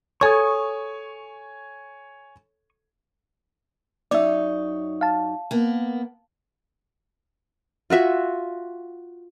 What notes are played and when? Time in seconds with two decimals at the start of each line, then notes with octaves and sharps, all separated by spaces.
0.21 A4 C#5 G#5 C#6 D#6 G#6
4.11 F#2 D#4 C#5 D5 E5
5.01 F5 A5
5.51 A#3 B3
7.90 F4 F#4 E5 G#5